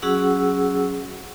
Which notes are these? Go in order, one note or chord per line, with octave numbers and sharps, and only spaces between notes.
F#3 C#4 F#4 G#4 F#5 E6